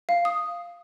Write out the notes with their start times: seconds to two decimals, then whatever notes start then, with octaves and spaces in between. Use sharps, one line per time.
0.09 F5
0.25 D#6